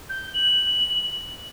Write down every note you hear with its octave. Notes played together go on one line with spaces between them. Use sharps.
G6
F#7